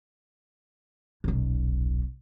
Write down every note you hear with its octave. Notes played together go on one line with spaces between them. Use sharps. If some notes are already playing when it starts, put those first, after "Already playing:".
D#1 B1